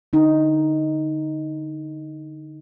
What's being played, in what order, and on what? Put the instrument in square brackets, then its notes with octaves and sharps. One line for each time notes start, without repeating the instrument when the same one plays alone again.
[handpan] D3 D#4